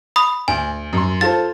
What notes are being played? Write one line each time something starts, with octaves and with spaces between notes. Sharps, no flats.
B5 D#6
D2 G#5
F#2 C6
F4 A4 C5 A6